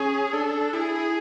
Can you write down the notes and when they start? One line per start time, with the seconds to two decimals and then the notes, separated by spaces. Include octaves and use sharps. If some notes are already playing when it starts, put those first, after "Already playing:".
Already playing: C#4 G#4
0.33 D4 A4
0.73 E4 G#4